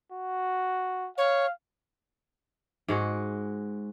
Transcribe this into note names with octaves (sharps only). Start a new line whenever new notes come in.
F#4
C#5 F5
G#2 G#3 F#4